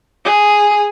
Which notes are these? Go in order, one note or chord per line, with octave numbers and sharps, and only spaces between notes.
G#4